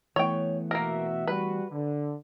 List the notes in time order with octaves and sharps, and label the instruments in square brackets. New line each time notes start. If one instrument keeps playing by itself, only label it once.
[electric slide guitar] E3 A3 B3 [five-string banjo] C#5 G5
[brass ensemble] B2 F#4 E5 [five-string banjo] A#3 A#4
[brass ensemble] G3 F#4 [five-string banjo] B4
[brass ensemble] D3